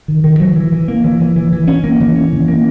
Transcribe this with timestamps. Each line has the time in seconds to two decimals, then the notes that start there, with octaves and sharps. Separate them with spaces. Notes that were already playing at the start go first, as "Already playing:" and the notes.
0.08 D#3
0.24 D#3
0.40 F#3
0.56 E3
0.72 E3
0.88 A#3
1.04 E3
1.20 E3
1.36 E3
1.53 E3
1.68 C#4
1.84 A#3
2.00 E3
2.16 C#4
2.33 E3
2.48 A#3